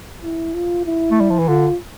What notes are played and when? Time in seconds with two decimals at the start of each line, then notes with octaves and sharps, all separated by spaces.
0.23 E4
0.54 F4
0.86 E4
1.11 A3
1.20 G3
1.30 F3
1.39 E3
1.48 D3 F4